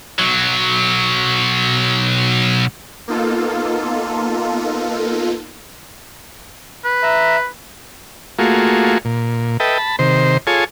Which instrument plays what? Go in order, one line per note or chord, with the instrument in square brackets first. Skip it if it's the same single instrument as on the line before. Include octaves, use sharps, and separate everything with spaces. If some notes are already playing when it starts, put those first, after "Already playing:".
[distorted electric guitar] B1 F#3
[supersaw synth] A#3 B3 D#4 F4 A4
[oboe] B4
[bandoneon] E5 A#5
[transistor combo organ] A3 A#3 F4 F#4 G#4
A#2
A4 B4 D#5 E5 G5
A5 B5
C3 D#3 C5
F4 G#4 A4 C#5 G#5